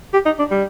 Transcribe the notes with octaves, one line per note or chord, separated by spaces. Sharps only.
G4
D#4
D4
G3